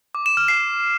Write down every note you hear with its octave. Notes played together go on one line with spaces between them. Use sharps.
D6
E7
F6
C7